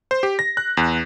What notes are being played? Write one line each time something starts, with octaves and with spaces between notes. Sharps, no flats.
C5
G4
A#6
F#6
E2